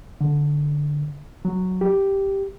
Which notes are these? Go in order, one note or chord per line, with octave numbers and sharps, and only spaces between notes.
D3
F#3
G4